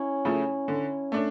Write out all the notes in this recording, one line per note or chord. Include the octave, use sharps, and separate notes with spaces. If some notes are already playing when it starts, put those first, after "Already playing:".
Already playing: C#4 E4
C#3 F3 A3
D3
A3 D4